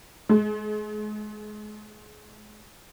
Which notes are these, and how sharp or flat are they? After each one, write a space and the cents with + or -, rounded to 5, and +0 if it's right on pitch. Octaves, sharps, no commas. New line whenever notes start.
G#3 +35